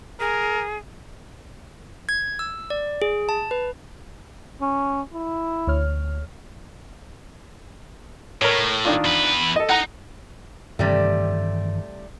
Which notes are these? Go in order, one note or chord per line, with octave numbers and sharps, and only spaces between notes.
G#4 A#4
G#6
E6
D5
G#4
A5
B4
C#4
E4
D2 C#5 F6
A2 A#4 C#5
D#3 D4 F4
E2 B4
A4 D#5
D#4 F#5 A#5
G2 C3 D#3 E3 G3 A3